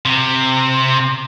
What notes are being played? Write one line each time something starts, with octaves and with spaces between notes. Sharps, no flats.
C3